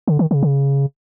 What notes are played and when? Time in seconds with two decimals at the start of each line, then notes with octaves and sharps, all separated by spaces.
0.08 D3
0.19 D#3
0.31 C#3
0.43 C#3